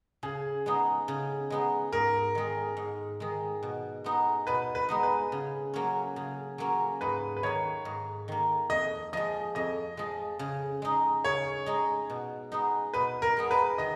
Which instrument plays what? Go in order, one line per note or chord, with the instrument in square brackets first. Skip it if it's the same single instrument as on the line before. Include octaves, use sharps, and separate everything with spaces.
[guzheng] C#3 [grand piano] G#4
[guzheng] G#3 B3 D#4
C#3
G#3 B3 D#4
[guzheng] G#2 [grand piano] A#4
[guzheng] D#3 G#3
G#2
D#3 G#3
B2
G#3 B3 D#4
[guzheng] B2 [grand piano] B4
[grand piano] B4
[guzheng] G#3 B3 D#4
[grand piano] B4
[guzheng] C#3
F#3 A#3 C#4
C#3
F#3 A#3 C#4
[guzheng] G#2 [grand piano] B4
[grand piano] B4
[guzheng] D#3 A#3 [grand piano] C#5
[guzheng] G#2
D#3 A#3
[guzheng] F2 [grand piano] D#5
[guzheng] F3 G#3 [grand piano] D#5
[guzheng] F2 [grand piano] D#5
[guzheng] F3 G#3
C#3
G#3 D#4
[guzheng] C#3 [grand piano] C#5
[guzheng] G#3 D#4
B2
G#3 B3 D#4
[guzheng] B2 [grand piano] B4
[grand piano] A#4
[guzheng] G#3 B3 D#4
[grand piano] B4
[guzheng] D#3 [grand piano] D#5